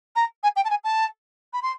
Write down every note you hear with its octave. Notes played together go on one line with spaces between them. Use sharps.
A#5
G#5
G5
A5
G#5
A5
B5
C6